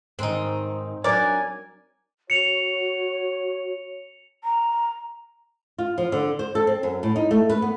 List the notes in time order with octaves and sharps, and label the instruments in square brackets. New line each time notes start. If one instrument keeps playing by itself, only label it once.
[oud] G#2 D#3 [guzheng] C4 D#4
[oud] F#3 D4 [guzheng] A#4 [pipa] D5 [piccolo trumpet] G#5
[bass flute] F#4 [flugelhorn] C#5 [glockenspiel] C#7 F7
[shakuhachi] A#5
[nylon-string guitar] F4
F3
D3
C5
A4
C4
F#2
A2
D#4
A3
B4
B3